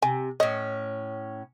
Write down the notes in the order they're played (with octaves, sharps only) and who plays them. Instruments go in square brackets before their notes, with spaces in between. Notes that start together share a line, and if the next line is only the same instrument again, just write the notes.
[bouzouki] C3 [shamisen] G#5
[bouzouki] A2 C#4 [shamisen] D#5